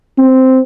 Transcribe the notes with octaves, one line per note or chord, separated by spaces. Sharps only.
C4